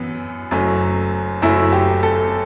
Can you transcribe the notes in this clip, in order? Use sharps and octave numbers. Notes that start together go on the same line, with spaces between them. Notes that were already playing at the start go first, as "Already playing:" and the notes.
Already playing: F#2 E3 B3
F#1 F#2 F#3 A3
F#1 F#2 F#3 A3 E4
G4
A4